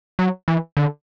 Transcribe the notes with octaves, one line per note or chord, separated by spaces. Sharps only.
F#3
E3
D3